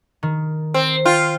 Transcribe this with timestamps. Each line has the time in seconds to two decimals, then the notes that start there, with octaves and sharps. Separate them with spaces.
0.23 D#3
0.74 C4
1.05 F4 G5